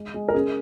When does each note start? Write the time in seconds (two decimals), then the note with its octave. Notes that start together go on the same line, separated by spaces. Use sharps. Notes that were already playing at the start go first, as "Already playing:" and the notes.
Already playing: G#3
0.14 G#3
0.28 A#4
0.34 C#4 G#4